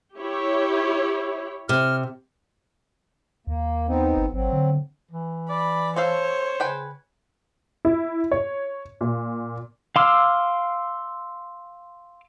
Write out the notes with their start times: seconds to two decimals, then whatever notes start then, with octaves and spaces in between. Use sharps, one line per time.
0.16 E4 G4 C#5
1.69 C3 F6
3.47 D#2 A#3
3.88 B3 C4 D#4
4.17 G1
4.33 G#1 F#3 C4
4.53 D3
5.11 E3
5.49 D5 B5
5.96 C4 A4 C5 C#5 F5
6.60 C#3 B4 G5 G#5
7.85 E4
8.31 C#5
9.01 A#2
9.96 F5 C6 D6 E6 F6